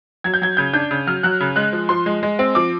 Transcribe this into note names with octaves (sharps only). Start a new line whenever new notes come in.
F#3 G#6
G6
F#3 G#6
C#3 G6
D4 G6
C#3
F#3 F6
F#3 F#6
C#3
G#3 F#6
F3
F3 C6
G#3
G#3
C4
F3 D6